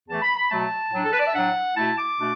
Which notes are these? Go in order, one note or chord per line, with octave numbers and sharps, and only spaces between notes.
E2 E3 A3 A5
B5
B5
B2 F#3 A3 A5
A2 F#3 D4
A4
B4
D5
E5
A2 F#3 D4 F#5
B2 A3 E4 A5
D6
B2 A3 D4